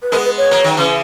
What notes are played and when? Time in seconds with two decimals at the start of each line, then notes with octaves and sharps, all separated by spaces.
0.02 B4
0.12 G#3 B3 A#4
0.25 B4
0.38 C#5
0.51 F#3 A#3
0.64 D#3 F#3
0.77 C#3 E3